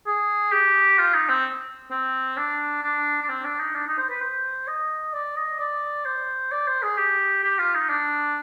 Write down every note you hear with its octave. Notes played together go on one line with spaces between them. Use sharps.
G#4
G4
F4
D#4
C4
C4
D4
D4
D4
C4
D4
D#4
D4
D#4
C5
B4
C5
D#5
D5
D#5
D5
C5
D5
C5
G#4
G4
G4
F4
D#4
D4